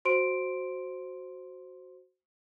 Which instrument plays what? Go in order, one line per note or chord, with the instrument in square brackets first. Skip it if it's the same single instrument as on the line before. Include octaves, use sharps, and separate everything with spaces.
[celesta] F#4 C5 C6 D7